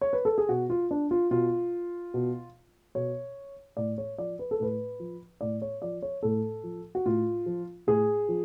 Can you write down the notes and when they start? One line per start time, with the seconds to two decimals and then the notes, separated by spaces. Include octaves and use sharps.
0.01 C#5
0.13 B4
0.25 A4
0.38 G#4
0.49 B2 F#4
0.70 F4
0.91 D4
1.11 F4
1.31 B2 F4
2.14 B2
2.95 B2 C#5
3.77 A2 D5
3.98 C#5
4.18 F3 D5
4.39 B4
4.51 A4
4.60 A2 B4
5.00 F3
5.41 A2 D5
5.62 C#5
5.82 F3 D5
6.02 C#5
6.23 A2 A4
6.64 F3
6.95 F#4
7.06 A2 F4
7.46 F3
7.87 A2 G#4
8.29 F3